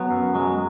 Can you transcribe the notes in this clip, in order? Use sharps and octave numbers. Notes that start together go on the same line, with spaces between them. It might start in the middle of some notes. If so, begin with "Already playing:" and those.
Already playing: F#3 B3
F#2
F#3 G#3